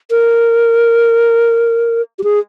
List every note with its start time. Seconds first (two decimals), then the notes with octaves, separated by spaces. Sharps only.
0.11 A#4
2.19 G4
2.24 G#4